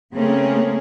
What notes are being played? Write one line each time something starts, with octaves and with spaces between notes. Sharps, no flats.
C#3 A3 A#3 C4 C#4 G#4